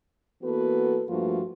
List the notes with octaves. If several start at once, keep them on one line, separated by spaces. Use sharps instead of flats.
E3 A#3 B3 F#4 A4 B4
G2 F3 A3 A#3 F4 F#4